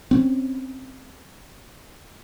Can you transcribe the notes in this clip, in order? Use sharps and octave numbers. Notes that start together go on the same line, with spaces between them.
C4 C#4